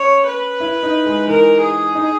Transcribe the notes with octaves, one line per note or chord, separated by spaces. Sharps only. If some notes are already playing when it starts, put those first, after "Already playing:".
Already playing: C#4 C#5
B4
E4
D#4
G#3
E3 A#4
G#4
D#4